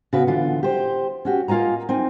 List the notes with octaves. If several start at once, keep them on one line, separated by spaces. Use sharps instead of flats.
C#3 B3 F#4 B4
D3 E3 F4
G4 C5
C#4 F#4 G4
A#3 F4 D#5 G#5 A#5
C4 D#4 G#5